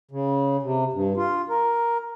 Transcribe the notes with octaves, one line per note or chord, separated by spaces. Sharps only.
C#3
C3
G2
F4
A#4